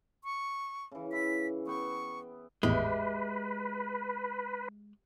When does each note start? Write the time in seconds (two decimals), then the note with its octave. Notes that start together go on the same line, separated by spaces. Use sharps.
0.24 C#6
0.91 C#3 E3
1.12 E4 B6
1.67 B3 G5 C#6
2.63 G#1 E2 A2 G#3 G4 B4 E5